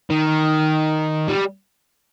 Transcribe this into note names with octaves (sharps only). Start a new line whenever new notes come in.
D#3
G3